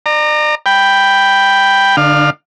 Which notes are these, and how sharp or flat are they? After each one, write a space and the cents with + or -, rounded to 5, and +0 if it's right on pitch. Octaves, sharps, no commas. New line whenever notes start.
D5 +40 A#5 -15
G5 +0 B5 +0
D3 -5 D4 +45 F5 +10